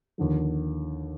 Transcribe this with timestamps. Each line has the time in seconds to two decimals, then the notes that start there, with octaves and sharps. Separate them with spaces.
0.18 D#2 D3 F3